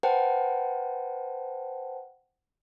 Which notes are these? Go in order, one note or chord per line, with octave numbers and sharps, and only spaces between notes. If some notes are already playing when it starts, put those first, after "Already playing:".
B4 C5 F#5 G5 A5